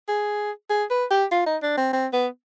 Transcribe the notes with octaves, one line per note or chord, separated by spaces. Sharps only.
G#4
G#4
B4
G4
F4
D#4
D4
C4
C4
B3